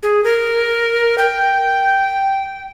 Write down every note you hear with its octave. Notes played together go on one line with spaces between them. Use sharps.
G#4
A#4
G5